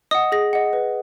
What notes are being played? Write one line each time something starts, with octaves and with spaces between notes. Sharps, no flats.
D#5 F#5 D#6
G#4 A#6
D#5 F#5
B4